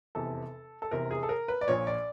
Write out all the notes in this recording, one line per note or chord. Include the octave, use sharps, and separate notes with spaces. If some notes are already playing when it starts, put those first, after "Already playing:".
F1 E2 C3 A4
A4
F1 E2 C3 A#4
G#4
A4
A#4
B4
D5
A#1 A#2 F3 C#5
D5